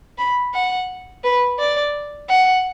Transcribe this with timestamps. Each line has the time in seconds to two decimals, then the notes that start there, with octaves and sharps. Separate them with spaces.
0.18 B5
0.54 F#5
1.24 B4
1.59 D5
2.29 F#5